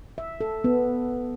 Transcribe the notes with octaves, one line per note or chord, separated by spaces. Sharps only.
E5
A4
B3